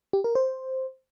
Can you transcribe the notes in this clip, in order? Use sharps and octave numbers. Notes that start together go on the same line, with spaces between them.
G4
A#4
C5